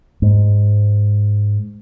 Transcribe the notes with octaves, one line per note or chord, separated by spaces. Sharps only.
G#2